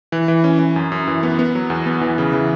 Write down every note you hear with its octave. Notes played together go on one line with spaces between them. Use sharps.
E3
E3
C#4
E3
F#2
F#2
E3
B3
B3
F#3
E2
B3
E3
C#3
E3